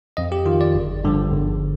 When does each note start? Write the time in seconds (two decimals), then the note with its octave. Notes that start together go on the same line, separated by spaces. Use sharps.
0.17 F2 D#5
0.32 G4
0.46 D#3 F4
0.61 D5
0.75 G1
1.04 G2 D3 F3
1.33 G1